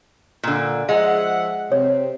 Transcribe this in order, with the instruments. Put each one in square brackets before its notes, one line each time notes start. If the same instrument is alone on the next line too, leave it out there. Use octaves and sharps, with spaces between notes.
[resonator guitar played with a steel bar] A#2 D3
[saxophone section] F3 E5 F#5 [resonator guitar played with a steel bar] G#3
[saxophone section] C3 [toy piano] C#5